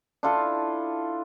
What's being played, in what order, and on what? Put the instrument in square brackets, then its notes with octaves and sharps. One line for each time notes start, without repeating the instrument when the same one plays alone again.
[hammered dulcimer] D4 E4 F4 A4